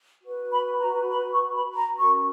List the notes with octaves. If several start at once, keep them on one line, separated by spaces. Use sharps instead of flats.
F#4 B4
B5
A#5
B5
C#6
B5
A#5
C#4 F#4 A#4 C#6